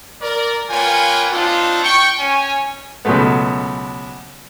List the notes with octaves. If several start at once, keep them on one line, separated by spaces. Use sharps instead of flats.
A#4 D5
A#3 F4 B4 C#5 G5 G#5
C4 D4 D#4 F4
G5 C#6
C#4 C#5 G#5
C#2 B2 F#3 G#3 A3 B3